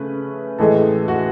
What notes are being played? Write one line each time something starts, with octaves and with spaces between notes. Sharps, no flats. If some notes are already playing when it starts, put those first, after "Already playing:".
Already playing: C#3 A3 C#4 B4
A2 E3 G#3 A4
F#4